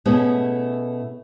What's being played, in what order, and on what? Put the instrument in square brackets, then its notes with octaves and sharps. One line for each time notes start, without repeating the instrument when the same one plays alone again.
[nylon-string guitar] B2 A3 B3 C#4 E4 G#4